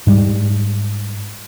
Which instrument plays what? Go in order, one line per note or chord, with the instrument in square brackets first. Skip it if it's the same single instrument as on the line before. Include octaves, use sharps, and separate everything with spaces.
[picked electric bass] G#2 G3